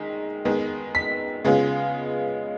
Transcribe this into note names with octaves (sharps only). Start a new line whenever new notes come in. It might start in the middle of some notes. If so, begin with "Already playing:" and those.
Already playing: D#3 G#3 B6
D#3 G#3 B3
B6
C#3 G#3 B3 F4